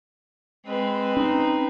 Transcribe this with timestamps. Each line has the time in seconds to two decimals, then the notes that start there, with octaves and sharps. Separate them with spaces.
0.66 G#3 C4 B4
1.17 C#4 D#4